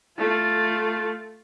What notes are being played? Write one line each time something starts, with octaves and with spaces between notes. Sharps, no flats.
A3 F4